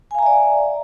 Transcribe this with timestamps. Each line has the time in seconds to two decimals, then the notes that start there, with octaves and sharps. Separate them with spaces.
0.11 G#5
0.15 F5
0.19 A#5
0.23 E5
0.26 D5